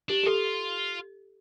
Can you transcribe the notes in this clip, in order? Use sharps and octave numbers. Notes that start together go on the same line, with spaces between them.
D4 G4
G4
F4 A4